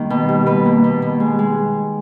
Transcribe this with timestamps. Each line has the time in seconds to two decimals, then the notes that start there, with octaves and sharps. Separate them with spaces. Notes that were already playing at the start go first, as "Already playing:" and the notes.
Already playing: D#3 G3 A#3
0.10 B2
0.29 G3
0.46 B2 B4
0.65 A#3
0.84 B2
1.02 B2
1.20 G#3
1.39 G#3